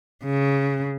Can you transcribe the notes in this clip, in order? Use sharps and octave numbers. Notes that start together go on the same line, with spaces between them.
C#3